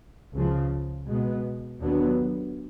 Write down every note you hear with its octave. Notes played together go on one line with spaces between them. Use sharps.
C#2 C#3 F3
B2 G#3 B3
D#2 D3 F#3 B3